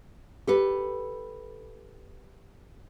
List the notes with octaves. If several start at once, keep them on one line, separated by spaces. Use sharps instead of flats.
G4 A4 B4